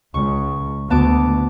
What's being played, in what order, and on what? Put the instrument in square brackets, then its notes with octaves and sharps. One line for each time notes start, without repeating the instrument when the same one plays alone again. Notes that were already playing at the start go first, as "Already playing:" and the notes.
[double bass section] C#2 [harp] C#6
[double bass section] D2 [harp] B3 A5 D6